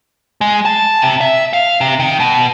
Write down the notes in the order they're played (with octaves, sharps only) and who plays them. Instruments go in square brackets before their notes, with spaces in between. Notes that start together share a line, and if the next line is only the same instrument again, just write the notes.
[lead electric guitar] G#3
A5
C3
E5
F5
C3
D#3
B2